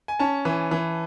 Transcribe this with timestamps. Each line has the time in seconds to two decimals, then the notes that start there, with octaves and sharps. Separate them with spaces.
0.08 G#5
0.19 C#4 A5
0.45 E3
0.71 E3